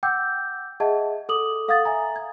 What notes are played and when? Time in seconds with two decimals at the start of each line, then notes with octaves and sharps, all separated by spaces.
0.03 F#5 G5 D6 E6 G6
0.80 G#4 D#5 E5 F#5 A5 G#6
1.29 A4 D6 D#6 F#7
1.68 A4 F5 F#5 D#6 G#6 A6
1.85 E5 F5 G#5 A#5
2.16 G#6